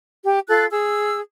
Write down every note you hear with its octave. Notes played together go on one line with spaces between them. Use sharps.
G4
F4 A4 F#6
G#4 E6